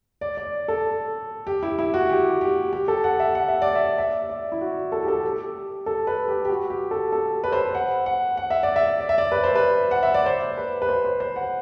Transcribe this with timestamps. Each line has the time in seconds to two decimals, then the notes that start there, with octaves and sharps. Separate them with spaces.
0.21 D5
0.37 D5
0.68 A4
1.47 G4
1.63 E4
1.79 E4
1.94 F#4
2.09 G4
2.41 G4
2.73 G4
2.88 A4
3.04 F#5
3.20 E5
3.35 F#5
3.48 E5
3.62 D5
3.75 E5
3.98 E5
4.29 D5
4.52 E4
4.61 F#4
4.92 A4
5.03 G4
5.08 A4
5.23 G4
5.86 A4
6.07 B4
6.28 G4
6.45 G4
6.49 F#4
6.70 G4
6.91 A4
7.12 A4
7.44 B4
7.53 C5
7.61 B4
7.75 F#5
8.06 F#5
8.37 F#5
8.50 E5
8.63 D5
8.76 E5
9.01 D5
9.09 E5
9.18 D5
9.32 B4
9.44 C5
9.55 B4
9.91 F#5
10.03 E5
10.14 D5
10.26 C5
10.58 B4
10.82 B4
10.89 C5
11.05 C5
11.20 C5
11.36 F#5